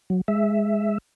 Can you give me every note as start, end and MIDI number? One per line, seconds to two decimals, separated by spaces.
0.10 0.21 54
0.28 0.98 56
0.28 0.98 76